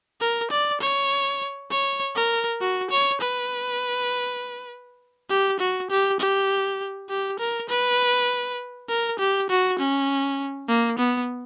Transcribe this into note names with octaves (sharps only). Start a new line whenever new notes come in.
A#4
D5
C#5
C#5
A#4
F#4
C#5
B4
G4
F#4
G4
G4
G4
A#4
B4
A#4
G4
F#4
C#4
A#3
B3